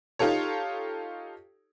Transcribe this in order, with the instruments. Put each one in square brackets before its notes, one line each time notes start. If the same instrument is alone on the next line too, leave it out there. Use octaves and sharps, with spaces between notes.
[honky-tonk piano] D#4 F4 G4 A4 C#5